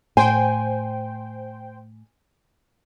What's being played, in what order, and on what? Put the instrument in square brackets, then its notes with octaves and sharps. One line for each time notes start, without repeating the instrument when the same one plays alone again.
[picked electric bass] A2 [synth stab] C5 G5 [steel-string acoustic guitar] G#5